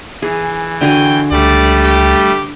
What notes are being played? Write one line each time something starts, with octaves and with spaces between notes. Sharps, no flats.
E3 G#4
D3 F#4 G5 G#5
C#2 G3 A3 D5
G4